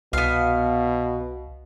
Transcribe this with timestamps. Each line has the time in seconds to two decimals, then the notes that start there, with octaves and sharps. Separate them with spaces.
0.13 C2 B2 B3 F5